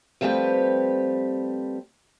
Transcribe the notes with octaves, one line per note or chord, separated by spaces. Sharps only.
F3 G3 A3 C4 G4 B4